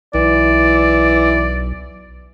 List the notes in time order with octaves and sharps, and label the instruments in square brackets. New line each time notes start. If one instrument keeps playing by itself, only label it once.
[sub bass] B1 [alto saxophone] E3 [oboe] D5